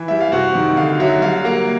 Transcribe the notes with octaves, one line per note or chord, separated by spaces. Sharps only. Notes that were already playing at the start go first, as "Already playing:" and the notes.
Already playing: E3
G3 E5
F5
C3 F#4 F#5
D#3
D3 F5
F#3 E5
G3 F5
A#3